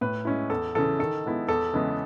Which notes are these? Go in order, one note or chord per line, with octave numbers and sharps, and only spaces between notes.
A2 B4
G#3 C#4 E4
E2 A4
C#3 E3 A4
D#3 A4
G#3 B3 E4
E2 A4
C#3 E3 G#3 B3